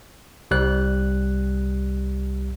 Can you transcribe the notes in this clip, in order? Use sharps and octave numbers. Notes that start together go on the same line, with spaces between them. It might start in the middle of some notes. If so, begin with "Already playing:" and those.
C2 G3 F#6